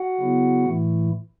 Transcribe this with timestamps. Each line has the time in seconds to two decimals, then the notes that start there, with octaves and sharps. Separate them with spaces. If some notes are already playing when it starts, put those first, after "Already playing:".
Already playing: F#4 F#5
0.19 C#3 F#3 B3 E4
0.65 A2 E3 A3 E4